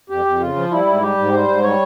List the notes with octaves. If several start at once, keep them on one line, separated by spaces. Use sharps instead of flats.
F2 G4
F2
C#3 F4
F3
G3 E4
G#2
G3 G4
G#2
G3 C5
G#2
G3 C#5